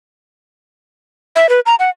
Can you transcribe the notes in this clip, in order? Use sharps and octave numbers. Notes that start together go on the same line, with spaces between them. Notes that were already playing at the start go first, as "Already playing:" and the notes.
E5
B4
A#5
F#5